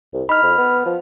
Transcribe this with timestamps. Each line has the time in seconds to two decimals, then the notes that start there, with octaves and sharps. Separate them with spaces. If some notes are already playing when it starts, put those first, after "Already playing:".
0.14 C2
0.29 D#4 B5 F6
0.43 F2
0.58 B3
0.86 F3